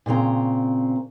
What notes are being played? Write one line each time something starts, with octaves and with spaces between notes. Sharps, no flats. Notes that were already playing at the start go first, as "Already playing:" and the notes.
A#2 C#3 C4 A#5